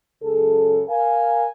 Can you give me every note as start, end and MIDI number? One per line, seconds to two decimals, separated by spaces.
0.23 0.82 37
0.23 0.82 42
0.23 0.82 49
0.23 0.82 68
0.23 0.82 69
0.89 1.46 70
0.89 1.46 77
0.89 1.46 80